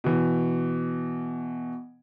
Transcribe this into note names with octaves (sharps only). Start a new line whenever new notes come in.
B2 E3